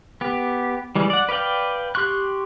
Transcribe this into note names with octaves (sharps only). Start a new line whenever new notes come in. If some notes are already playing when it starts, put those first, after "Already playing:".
B3 G4
E3 G3 G#3
D5 F#5
B4 D5 F5 G5
G4 C6 C#6 F#6